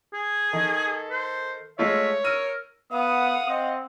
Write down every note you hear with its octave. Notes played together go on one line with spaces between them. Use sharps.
G#4
D#3 A4
C5
G#3 A3 F4 C#5 E5
A#4 E6 D#7
B3 F5 F#5 D#6
C4 D#5